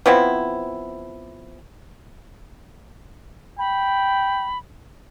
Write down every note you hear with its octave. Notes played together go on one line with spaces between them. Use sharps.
F3 B3 C4 E4
G5 B5